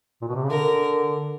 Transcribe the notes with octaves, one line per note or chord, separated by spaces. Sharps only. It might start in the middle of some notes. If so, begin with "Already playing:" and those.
A#2
B2
C3
C#3
D3 A#4